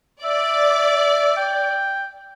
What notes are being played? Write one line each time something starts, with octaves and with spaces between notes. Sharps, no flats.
D5 E5
G5